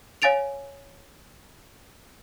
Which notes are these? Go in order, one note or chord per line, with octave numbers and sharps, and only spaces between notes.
C#5 F5 G#5 A6 D7 F7